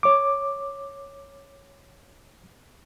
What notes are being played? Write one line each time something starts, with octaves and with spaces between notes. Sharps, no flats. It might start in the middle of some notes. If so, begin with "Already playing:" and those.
C#5 D6